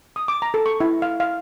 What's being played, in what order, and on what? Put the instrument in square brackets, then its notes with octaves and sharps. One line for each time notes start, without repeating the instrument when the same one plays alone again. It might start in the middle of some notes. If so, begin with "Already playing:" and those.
[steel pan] D#6
D6
A#5
A4
C#6
E4
F5
F5